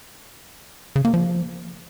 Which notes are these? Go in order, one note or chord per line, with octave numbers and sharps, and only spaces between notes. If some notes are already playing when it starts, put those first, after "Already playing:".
C#3
A#3
F3